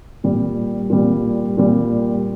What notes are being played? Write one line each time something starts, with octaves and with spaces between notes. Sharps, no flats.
A#2 G3
A#2 G3
A#2 G3